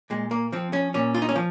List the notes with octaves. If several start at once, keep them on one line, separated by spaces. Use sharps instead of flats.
A#2 G#3
A#3
F3 C4
C#4
A#2 C#4
F4
D#4
C#4
F3